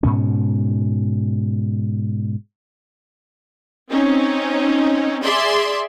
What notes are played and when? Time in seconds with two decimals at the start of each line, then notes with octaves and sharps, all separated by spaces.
0.03 G#2 B2 C#4
3.91 C4 C#4 D#4
5.23 G#4 D5 E5 C6